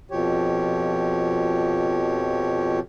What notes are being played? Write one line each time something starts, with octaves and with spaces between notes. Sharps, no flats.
F2 B2 F3 G4 C#5